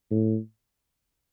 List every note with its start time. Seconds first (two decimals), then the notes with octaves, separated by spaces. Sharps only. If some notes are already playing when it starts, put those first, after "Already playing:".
0.11 A2